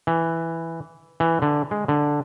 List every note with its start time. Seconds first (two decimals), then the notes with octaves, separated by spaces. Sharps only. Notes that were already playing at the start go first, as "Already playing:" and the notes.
0.07 E3
1.20 E3
1.42 D3
1.71 G#3
1.88 D3